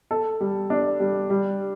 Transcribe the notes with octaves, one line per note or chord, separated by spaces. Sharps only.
A4
G3
D4
G3
G3